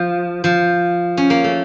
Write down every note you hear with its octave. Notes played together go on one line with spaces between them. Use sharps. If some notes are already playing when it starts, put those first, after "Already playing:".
Already playing: F3
F3
C#4
A#3
A3